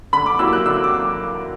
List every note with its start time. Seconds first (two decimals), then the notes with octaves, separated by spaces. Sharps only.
0.13 D3 B5
0.26 D6
0.39 F#3 A#3 E4 G4 E6
0.53 F#6
0.66 D3 E6
0.84 D6